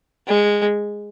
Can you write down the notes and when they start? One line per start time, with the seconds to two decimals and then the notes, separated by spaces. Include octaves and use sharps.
0.27 G#3